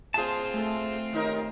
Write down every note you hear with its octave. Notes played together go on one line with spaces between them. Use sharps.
A2 C4 F4 G#4 C5 A5
A3 A4
D#2 D#4 A#4